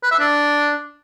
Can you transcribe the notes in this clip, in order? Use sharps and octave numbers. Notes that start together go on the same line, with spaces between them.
B4
E5
D4